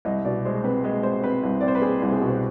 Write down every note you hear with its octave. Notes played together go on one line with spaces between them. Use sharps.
C2 D#5
B2 D5
G#3 C5
C4 B4
G#3 B4
G#3 C5
C4 B4
C2
C4 D5
C5
B4
C4 G#4
C2
G#4
B2
C5